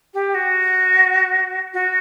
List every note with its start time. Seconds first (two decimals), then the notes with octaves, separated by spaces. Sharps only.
0.13 G4
0.34 F#4
1.73 F#4